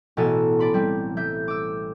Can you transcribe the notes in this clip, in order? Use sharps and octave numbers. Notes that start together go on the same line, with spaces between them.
A1 B2 B3 A4 G#5 E7
D5 B5 C6
G3 C4
G3 E5 G6
D6 E6